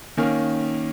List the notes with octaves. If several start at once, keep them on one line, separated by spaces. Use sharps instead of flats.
D#3 A#3 C#4